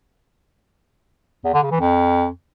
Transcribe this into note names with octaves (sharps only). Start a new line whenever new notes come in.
E2
D3
C#3
E3
F2